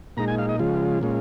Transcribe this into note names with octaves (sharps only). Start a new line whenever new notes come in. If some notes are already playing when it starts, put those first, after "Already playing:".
A#2 G#3 D#4 A#5
G#5
F5
D#5
C#3 F3 G#3 F4
A#2 G#3 C#4 F4